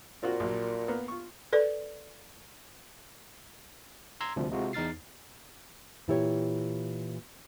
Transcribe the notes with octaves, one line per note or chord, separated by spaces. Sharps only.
A#2 C4 F4 F#4
A#1 F#3
A#3 B3
F4 C#6
A4 B4 D5
A#5 C6 E6 G#6
D2 C3 F3 G3
C3 G#3 F4 F#4
E2 D#4 F6 A6 C7
A#2 E3 E4 G4 G#4 C#5